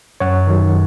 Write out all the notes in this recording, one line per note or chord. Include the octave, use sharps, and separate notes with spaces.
F#2 C#5 F#5
D#3 F#3